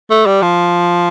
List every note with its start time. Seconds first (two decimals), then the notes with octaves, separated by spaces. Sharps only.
0.11 A3
0.27 G3
0.42 F3